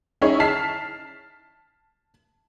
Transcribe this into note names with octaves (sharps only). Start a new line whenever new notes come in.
C#4 D#4 E4 G#4 C#5
A5 F6 B6 C7